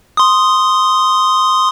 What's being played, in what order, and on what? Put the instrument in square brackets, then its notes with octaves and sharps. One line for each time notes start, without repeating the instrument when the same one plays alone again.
[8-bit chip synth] C6 D#6